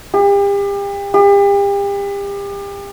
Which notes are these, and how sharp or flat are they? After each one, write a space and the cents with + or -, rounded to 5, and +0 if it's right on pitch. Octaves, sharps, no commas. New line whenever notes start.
G4 +35
G4 +35